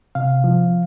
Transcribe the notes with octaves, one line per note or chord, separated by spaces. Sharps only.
C3 F5
F3